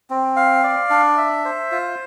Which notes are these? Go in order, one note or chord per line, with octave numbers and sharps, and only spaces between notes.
C4
F5
D5
D4
E5
C5
F4